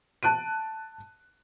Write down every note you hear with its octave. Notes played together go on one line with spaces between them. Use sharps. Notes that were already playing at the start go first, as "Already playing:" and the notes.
A5 F#6 D7 D#7